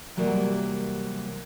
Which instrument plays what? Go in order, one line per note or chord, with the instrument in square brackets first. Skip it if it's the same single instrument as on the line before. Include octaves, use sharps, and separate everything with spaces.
[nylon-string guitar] C3 E3 F#3 G3 A#3